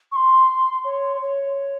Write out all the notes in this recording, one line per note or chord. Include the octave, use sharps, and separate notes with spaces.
C#6
C6
C#5
C#5